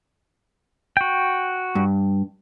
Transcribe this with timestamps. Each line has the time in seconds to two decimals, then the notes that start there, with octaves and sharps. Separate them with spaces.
0.97 F#4 G5
1.75 G2